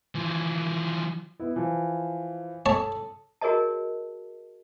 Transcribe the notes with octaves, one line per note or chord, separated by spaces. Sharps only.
E3 F3
B3 E4
E3 F3
A4 C#5 A5 D#6
F#4 G#4 A#4 C#5 D#5 A5